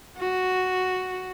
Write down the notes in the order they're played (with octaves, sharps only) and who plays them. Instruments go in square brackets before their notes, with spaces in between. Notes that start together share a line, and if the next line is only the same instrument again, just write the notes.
[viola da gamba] F#4